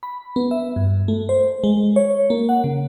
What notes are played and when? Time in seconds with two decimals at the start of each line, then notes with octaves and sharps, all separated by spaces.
0.03 B5
0.36 B3
0.51 E5
0.76 G2
1.08 A3
1.29 C5
1.64 G#3
1.96 C#5
2.30 A#3
2.49 F#5
2.64 C#3